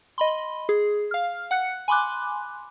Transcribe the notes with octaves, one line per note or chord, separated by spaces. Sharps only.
D#5 B5 C6
G#4
F5 F6
F#5 F#6 C#7
G#5 B5 C6 D6 F#6